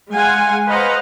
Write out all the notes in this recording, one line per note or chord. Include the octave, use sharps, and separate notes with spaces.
G#3 F5 F#5 G#5 C6
B4 C5 D#5 F5 F#5 A#5